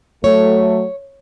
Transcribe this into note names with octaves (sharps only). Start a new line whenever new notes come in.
F#3 A3 C#5